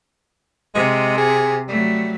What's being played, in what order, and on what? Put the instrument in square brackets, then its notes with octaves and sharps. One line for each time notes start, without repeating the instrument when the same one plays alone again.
[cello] C3 [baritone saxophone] G#3
[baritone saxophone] G#4
[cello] F#3 A3 [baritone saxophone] G3